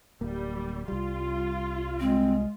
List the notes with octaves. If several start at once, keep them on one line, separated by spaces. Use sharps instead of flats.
D1 G3 A#3
C2 G3 F4
G#3 C4